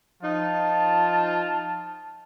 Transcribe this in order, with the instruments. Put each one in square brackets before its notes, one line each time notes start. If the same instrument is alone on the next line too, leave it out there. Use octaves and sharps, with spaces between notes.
[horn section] F3 D#4 F4 [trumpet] A5